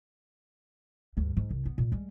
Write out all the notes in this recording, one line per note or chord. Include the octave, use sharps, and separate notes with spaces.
D2 G2
G#2
C2
B3
A#2
G3 G#3